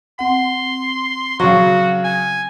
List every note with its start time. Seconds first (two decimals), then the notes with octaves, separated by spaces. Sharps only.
0.19 C4 F#5 C6
1.40 C#3 F#3 F#4 C#6
2.04 G#5